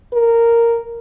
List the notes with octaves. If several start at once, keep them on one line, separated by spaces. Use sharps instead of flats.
A#4